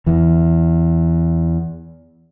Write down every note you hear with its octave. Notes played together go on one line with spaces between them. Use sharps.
E2 E3